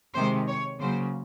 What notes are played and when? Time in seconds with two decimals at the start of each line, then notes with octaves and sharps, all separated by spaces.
0.14 C3 D#3 G#3 C5
0.48 C#5
0.80 C#3 F#3 A#3 C5